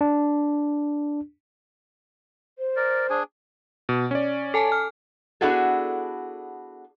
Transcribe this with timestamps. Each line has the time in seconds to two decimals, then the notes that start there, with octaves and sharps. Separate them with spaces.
0.01 D4
2.59 C5
2.76 A#4 D5
3.10 D4 G#4 G#5
3.89 B2
4.11 C#4 D5
4.54 A4 G#5 A5
4.72 F6
5.41 B3 D4 E4 F#4 G#4 A4